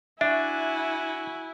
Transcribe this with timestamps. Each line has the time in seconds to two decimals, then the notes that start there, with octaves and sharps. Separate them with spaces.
0.21 D4 E4 F#4 E5 G#5